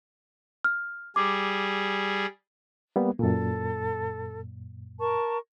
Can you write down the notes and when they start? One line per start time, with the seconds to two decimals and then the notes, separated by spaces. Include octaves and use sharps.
0.64 F6
1.16 G3 G#4 D6
2.96 G3 A#3 B3
3.19 F#2 A#2 A4
5.00 A#4 A5 C#6